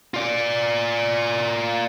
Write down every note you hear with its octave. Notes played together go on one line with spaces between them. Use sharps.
F4 D5